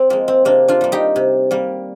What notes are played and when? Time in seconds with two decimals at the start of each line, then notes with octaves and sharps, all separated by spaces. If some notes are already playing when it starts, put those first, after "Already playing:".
Already playing: C4
0.10 F3 G#3 A#3
0.28 C4
0.45 C3 A#3 D4
0.68 D4 F4
0.81 G3 A#3
0.92 D#4 G4
1.16 C3
1.51 G3 A#3